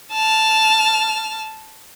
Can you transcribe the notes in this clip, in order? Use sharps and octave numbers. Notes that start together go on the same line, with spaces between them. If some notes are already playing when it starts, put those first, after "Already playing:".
A5 F6